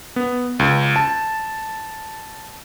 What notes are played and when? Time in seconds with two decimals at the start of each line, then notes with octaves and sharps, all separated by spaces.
0.16 B3
0.59 C#2
0.96 A5